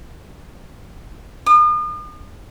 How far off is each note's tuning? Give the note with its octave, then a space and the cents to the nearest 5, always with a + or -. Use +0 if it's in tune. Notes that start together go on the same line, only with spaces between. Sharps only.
D#6 -40